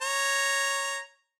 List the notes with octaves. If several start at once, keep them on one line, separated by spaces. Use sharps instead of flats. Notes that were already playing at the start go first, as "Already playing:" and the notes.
C#5 A#5